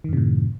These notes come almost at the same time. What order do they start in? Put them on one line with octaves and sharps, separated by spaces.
D#3 F#2 C3 A2